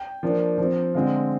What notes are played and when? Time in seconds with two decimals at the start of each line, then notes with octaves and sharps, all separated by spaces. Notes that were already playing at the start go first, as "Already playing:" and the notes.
Already playing: G5
0.23 F3 A#3 D4
0.58 F3 C4
0.94 D3 G#3 C4 F5